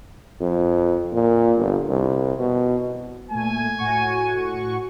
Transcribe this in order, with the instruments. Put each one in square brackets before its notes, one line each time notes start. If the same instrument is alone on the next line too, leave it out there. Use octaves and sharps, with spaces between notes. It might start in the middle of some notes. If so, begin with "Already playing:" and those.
[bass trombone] F2
A#2
G1
C2
B2
[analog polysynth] A#2 A3 [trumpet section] G#5
[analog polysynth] A2 F#4 C#6